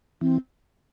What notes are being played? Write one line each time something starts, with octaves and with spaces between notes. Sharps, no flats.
E3 C4